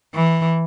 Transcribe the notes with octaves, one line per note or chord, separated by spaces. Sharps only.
E3